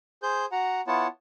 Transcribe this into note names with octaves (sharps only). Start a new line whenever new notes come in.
G#4 C5 G6
F#4 F#5 A#5
B3 E4 F4 C#5 F#5 A5